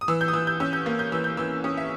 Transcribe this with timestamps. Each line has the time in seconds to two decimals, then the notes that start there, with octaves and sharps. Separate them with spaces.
0.01 D#6
0.08 E3 E6
0.21 G6
0.28 D#6
0.33 E3 E6
0.47 G6
0.60 C#4 E6
0.73 G6
0.86 A#3
0.99 G6
1.12 E3 E6
1.24 G6
1.37 E3 E6
1.64 C#4 D#6
1.77 E5